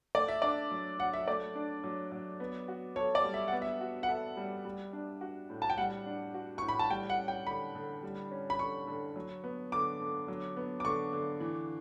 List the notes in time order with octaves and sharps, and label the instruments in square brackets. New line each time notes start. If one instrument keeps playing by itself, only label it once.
[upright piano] A3 [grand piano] D5
[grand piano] E5
[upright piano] D4 [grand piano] D5
[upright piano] F#3
[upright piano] F#3 [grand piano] F#5
[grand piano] E5
[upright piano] A3 [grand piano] D5
[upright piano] D4
F#3
F#3
B3
F#4
[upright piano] A4 [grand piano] C#5
[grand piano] D5
[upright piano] G3
[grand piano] E5
[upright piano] B3 [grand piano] F#5
[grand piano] E5
[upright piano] F#4
[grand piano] F#5
[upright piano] A4 [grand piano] E5
[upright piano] G3
G3
D4
F#4
A2
[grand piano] A5
G5
[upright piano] G3 [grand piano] F#5
[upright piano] D4
F#4
[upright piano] A2 [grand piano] C#6
[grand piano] B5
A5
[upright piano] G3 [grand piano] G5
[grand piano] F#5
[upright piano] C#4
[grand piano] G5
[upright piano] D3 [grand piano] B5
[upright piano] D3
G3
C#4
[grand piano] B5
[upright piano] D3 [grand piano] C#6
[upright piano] D3
F#3
B3
[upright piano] D3 [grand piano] D6
[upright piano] D3
F#3
B3
[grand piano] D6
[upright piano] D3 [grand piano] C#6
[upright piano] D3
E3